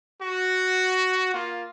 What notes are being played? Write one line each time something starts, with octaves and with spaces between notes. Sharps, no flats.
F#4
A#3 F4